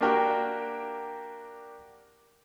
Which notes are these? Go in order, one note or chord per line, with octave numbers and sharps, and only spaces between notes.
A#3 D4 F#4 G4 A#4 G5